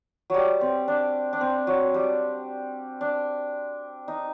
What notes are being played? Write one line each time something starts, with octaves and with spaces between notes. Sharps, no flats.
F#3 G3
C4
D4
D4
C4
F#3
G3
D4
D#4